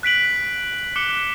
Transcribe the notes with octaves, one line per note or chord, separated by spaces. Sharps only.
F#6 B6 D7 F#7
D6 F#6 C#7 E7 G7